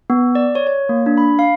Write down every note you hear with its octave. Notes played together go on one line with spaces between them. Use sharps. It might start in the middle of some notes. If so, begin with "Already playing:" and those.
B3
D5
C#5
C#5
A#3
D4
B5
F5